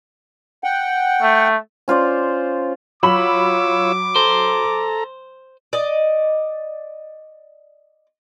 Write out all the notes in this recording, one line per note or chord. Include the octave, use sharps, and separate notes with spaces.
F#5 G5
A3
C#4 F4 C5 D5
F#3 F4 C#5 B5 D6 E6 F#7
A4 C5 A#5
D5 D#5